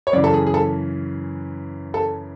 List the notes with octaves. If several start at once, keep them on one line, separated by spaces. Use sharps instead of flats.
C#5
F#2 C#3 E3 D5
A4
G#4
G#4
A4
A4